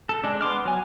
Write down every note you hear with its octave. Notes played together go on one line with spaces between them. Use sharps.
A4
G#3 D4
B3 C6 D6 F6
F#3 G#5